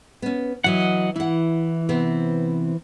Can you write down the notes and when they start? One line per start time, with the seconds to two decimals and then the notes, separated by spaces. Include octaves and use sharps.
0.22 B3 C#4
0.64 E3 F#3 D#5 F#5
1.16 E3 E4 F#5
1.89 C3 B3 C4